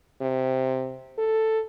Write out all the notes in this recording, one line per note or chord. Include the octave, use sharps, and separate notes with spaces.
C3
A4